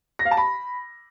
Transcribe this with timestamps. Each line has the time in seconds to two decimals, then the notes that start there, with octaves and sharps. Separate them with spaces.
0.19 A#6
0.25 F5
0.31 A5
0.37 B5